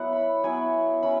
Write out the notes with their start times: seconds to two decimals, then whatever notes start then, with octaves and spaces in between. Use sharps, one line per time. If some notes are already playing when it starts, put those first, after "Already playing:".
Already playing: F#3 B3 E4 F#5
0.13 B5
0.44 F#3 B3 E4 G#5
1.03 F#3 C#4 E4 B5